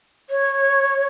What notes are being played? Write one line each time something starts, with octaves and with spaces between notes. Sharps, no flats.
C#5